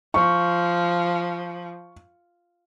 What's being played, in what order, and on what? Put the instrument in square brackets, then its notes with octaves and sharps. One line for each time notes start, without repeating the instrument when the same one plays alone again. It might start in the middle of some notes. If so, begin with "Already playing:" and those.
[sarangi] F3 [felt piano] C#6